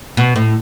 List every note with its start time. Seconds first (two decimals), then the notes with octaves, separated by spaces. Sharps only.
0.17 B2
0.36 A2